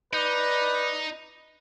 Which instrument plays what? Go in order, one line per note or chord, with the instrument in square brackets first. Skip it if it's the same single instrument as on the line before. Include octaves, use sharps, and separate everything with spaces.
[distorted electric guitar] D#4 [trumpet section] B4 D5